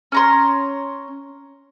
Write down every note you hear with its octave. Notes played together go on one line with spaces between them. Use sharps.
C#4 A#5 C6